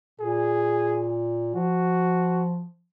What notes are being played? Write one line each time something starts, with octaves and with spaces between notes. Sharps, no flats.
A#2 G#4
F3 F#4